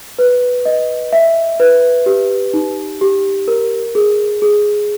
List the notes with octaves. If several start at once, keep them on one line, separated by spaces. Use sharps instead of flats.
B4
D#5
E5
B4
G4
D#4
G4
A#4
G#4
G#4